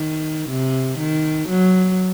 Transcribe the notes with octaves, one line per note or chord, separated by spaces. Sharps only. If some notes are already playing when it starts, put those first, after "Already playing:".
Already playing: D#3
C3
D#3
F#3